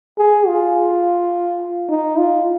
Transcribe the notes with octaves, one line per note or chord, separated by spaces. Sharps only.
G#4
F4
D#4
F4